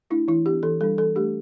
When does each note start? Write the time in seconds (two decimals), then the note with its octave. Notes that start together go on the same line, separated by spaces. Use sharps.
0.10 A3 D4 E4
0.28 E3 E4
0.45 B3 D4 G4
0.63 E3 A4
0.81 G3 D4 A4
0.98 E3 A4
1.15 A3 D4 G4